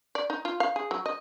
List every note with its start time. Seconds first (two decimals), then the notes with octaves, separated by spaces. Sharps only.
0.15 D5
0.30 D#4
0.45 F4
0.60 F5
0.76 G#4
0.91 F#3
1.06 D#5